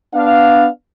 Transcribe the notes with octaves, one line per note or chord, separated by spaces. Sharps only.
B3 D4 F5